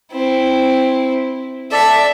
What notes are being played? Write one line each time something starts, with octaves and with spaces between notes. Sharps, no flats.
C4 E4
A4 D5 E5